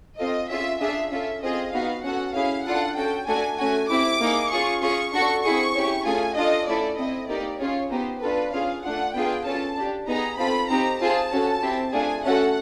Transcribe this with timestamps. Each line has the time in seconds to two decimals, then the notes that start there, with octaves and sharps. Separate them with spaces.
0.18 C4 F4 A4 D#5
0.49 C#4 F4 G#4 E5
0.80 D4 F4 G#4 E5
1.11 C#4 F4 A4 E5
1.42 C4 F4 G#4 D#5
1.73 B3 D#4 F#4 F5
2.03 C#4 F#4 A4 F#5
2.34 C#4 E4 G#4 F5
2.65 D4 F4 A4 F#5
2.96 C#4 F#4 A4 G5
3.27 A3 D4 F#4 A4 G#5
3.58 A3 C#4 F#4 G#5
3.89 C4 E4 G4 D6
4.20 A#3 D#4 G#4
4.51 C#4 F4 G#4 C#6
4.82 C#4 F4 G#4 C#6
5.12 D4 F#4 A4 C#6
5.44 C4 E4 G#4 C#6
5.75 C#4 E4 G4
6.05 A3 C#4 F4 G#4 G#5
6.36 D4 F4 A4 D#5
6.67 A3 C#4 E4 A4 D5
6.98 C4 E4 A4 D#5
7.29 A#3 D#4 G4 D5
7.60 C#4 F4 G#4 C#5
7.91 B3 D#4 G4 C5
8.21 D4 F4 A4 B4
8.53 C#4 F4 G#4 F5
8.83 A3 D4 F4 F#5
9.14 B3 D4 F4 G#4 G5
9.46 C#4 F4 A4 A5
9.76 D4 G4
10.07 B3 D#4 G#4 A#5
10.37 C4 F4 A4 B5
10.69 C4 D#4 G4 A#5
11.00 C4 F4 G#4 A5
11.31 C#4 F#4 A4
11.62 C4 E4 G4
11.92 A3 D4 F4 G#4 G#5
12.23 A3 C#4 F#4 A4 F#5